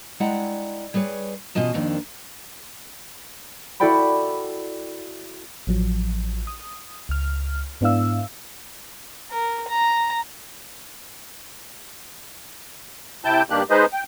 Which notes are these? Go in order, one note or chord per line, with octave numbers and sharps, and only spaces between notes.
G#3 E4 D5 F#5 G5 A#5
G3 G#4 B4 C#5
E2 B2 C#4 F4 D#5 A5
F2 D#3 A#3 C4 D4
E4 F#4 A4 D5 G5 B5
A1 F3 F#3
D#6
C#2 F6
G#2 B3 D4 E4 F5 E6
A#4
A#5
C3 E4 G5 A5 G6
G2 D#3 A#3 D4 G4 F#6
G#3 D#4 G#4 B4 C5 D#5
G5